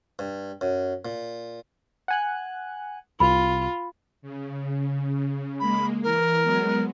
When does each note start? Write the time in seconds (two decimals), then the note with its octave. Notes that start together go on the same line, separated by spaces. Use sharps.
0.19 G2
0.61 F#2
1.05 A#2
2.08 F#5 G#5 F#6
3.20 C2 F4 B5
4.22 C#3
5.60 G#3 A#3 B5
6.03 E3 A#4
6.43 F#3 G#3 B3